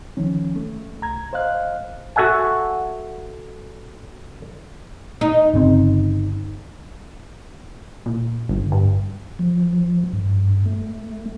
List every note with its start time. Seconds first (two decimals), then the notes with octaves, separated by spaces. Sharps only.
0.17 D#3 F3 C#4
0.56 A3
1.02 C2 A#5 G#6
1.33 C5 D#5 F5 F#6
2.16 F#4 A4 E5 F#5 G#5
5.21 D#4
5.54 G1 C#3 C4
8.06 A#2
8.49 G1
8.72 G2
9.39 F3
10.13 G2
10.66 A3